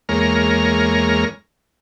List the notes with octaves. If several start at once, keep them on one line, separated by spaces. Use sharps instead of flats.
E2 G#3 A#3 A#4 C#5 F6